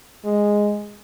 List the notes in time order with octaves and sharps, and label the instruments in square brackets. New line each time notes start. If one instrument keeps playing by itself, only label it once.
[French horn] G#3